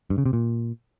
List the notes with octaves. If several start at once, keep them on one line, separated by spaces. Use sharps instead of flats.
G2
C#3
C3
A#2